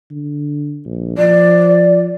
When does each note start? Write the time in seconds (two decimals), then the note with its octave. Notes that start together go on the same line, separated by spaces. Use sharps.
0.11 D3
0.85 A#1
1.18 F3 D5